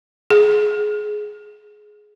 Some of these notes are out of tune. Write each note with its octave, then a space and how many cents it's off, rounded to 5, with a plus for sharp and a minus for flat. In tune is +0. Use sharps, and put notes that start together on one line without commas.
G#4 +15